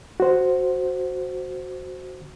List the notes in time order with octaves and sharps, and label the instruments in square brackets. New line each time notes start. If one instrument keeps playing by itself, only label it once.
[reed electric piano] F#4 C5